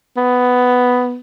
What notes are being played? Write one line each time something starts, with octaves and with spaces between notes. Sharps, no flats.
B3